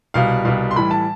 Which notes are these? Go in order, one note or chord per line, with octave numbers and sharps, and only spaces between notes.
C2 B2 G3 F5
C2 B2 G3 F5
C6
A2 E3 G3 B5
A5